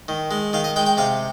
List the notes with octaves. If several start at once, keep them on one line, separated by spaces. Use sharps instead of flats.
D#3
G#3
D#3 F5
D#5
G#3 G5
G5
C3 F5